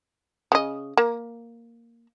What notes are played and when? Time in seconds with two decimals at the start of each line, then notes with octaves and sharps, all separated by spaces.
0.52 C#3 D#5
0.97 A#3